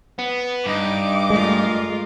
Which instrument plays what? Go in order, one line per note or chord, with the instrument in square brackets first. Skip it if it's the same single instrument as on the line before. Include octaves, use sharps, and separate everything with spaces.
[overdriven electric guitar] B3
[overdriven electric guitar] G2 [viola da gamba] D#4 [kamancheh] D#5 D6
[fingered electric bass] G#3 [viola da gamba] A3 F4 A#4